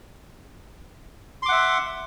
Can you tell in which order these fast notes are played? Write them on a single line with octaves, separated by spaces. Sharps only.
C6 D6 F#5 E5